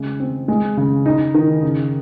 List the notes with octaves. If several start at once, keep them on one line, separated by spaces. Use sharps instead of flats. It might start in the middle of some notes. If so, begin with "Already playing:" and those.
Already playing: C#3 G#3
C4
G#3
C#3
D#4
D#3
C#3